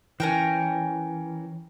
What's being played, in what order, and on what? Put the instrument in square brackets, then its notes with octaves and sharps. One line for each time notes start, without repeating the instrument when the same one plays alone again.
[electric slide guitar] E3 [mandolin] C#4 A#4 G5